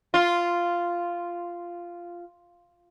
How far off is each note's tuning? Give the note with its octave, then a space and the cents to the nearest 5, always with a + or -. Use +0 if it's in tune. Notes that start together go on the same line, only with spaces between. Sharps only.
F4 -5